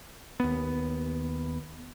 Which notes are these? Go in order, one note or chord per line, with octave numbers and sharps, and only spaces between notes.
D#2 B3